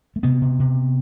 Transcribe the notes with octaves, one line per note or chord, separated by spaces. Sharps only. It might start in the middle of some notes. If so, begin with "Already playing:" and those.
A3
C3 B3
C3
C3